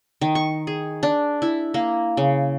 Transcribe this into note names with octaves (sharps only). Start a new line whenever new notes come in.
D#3
C#6
G#4
D4
E4
A#3
C#3